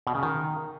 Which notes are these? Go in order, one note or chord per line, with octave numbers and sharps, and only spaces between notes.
B2
C#3
D#3